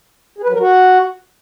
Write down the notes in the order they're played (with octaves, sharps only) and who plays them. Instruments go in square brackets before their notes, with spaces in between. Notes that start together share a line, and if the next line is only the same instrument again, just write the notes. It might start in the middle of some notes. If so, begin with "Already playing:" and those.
[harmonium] G#4
B4
F#3
A#4
F#4